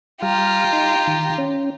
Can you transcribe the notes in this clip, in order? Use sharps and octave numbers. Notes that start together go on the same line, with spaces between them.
G3 F4 G4 F5 A#5
D#4
D#3
C#4